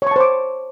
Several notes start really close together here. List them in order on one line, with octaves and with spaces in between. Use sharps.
C#5 C#6 A5 C5 D6